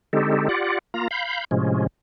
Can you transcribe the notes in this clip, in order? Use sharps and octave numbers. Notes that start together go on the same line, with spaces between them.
D3 G#3 C4 D#4 G4 A4
F4 G4 D5 F#5
A#3 F4 A#5
F5 B5 G6
A2 C3 F3 G#3 C#4